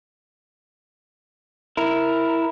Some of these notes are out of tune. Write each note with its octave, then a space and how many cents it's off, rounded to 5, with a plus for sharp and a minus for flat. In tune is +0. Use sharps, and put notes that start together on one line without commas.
E4 +0 A#4 +0